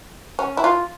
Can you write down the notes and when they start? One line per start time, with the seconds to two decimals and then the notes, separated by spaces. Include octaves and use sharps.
0.39 C#4
0.57 E4
0.64 F4